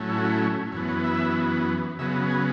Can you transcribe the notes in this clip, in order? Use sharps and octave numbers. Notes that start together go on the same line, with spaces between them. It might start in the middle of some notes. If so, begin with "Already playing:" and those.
Already playing: A2 F#3 A3 C#4
E4
F#4
E4
F#2 E3 B3 C#5
C#5
E5
C#3 F#3 B3 E5
G#5